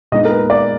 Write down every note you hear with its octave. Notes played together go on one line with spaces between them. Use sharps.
A#2 G#3 B3 D#4 D#5
A#4
B4
D5